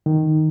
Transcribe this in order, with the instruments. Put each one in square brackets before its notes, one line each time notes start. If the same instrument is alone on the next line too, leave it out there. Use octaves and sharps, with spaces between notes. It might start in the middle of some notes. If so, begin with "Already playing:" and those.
[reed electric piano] D#3